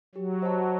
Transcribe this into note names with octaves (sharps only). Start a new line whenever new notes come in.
F#3 G4
C5 D#5 F#5 A5